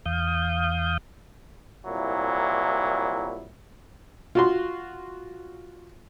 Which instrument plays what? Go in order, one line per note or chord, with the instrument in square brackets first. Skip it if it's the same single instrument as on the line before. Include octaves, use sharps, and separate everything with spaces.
[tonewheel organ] E2 F5 D#6 G6
[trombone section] C2 A#2 F#3 E4
[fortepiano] F4 F#4 C6